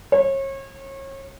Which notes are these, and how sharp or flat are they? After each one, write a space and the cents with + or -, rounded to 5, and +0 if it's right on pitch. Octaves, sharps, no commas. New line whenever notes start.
C#5 -35